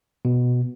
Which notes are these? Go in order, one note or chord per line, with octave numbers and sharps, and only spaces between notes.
B2